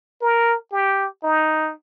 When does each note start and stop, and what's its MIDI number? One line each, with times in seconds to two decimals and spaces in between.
0.21 0.56 70
0.72 1.07 67
1.24 1.73 63